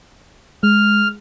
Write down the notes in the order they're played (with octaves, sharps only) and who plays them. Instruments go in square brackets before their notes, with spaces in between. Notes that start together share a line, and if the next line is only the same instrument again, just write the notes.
[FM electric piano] G#3 [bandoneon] F6